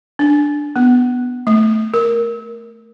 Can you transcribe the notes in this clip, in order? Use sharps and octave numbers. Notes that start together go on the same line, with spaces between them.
D4
B3
A3
A#4